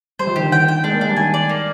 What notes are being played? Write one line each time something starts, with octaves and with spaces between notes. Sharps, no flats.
G3 C5
F3
D#3 G4
D3
D#3 G5
G5
G#3 D4
A#3
G#3 D4
G3
D#3 G#5
D5
A#3